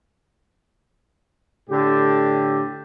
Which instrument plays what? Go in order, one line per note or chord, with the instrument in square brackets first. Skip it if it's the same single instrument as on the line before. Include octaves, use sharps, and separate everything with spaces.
[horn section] A2 D3 G4